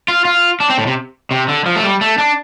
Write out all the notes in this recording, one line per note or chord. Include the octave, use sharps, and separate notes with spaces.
F4
F4
D4
C4
A2
C3
C3
D3
F3
A3
G3
A3
D4